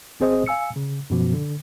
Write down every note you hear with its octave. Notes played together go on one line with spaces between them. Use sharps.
G#1 C4 G#4 C5 D#5 D#6
F5 G#5 E6 C#7
C#3
F#2 B2 F3
D3